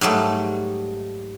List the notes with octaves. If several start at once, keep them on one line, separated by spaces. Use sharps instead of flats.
G#2 F#3 G3 A3